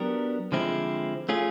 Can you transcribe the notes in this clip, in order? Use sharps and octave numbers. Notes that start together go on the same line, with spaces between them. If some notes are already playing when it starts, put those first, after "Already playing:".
Already playing: F#3 B3 D4 G4 A#4
D3 F3 G#3 C4 E4
A3 C#4 F4 G#4